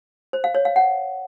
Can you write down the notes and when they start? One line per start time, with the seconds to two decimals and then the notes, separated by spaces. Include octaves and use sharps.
0.33 C5
0.44 F5
0.55 C#5
0.65 F5
0.76 F#5